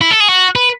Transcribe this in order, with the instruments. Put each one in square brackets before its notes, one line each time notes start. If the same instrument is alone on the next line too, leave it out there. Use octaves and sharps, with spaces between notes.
[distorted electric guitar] E4
A4
G#4
F#4
B4